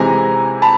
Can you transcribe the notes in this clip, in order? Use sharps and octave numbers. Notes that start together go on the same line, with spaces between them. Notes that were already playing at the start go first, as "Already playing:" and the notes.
Already playing: C3 E3 G#3 C4 G#5 A#5
A5 B5